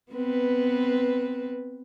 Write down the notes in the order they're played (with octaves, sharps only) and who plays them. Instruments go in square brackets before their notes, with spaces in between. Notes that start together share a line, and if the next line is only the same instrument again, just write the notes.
[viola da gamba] B3 C4 B4